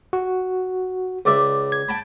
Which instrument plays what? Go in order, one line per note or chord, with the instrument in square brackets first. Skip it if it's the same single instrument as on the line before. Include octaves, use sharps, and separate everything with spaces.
[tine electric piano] F#4
[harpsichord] C#2 D5 E5
[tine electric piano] G#6
[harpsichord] G5 A5 B5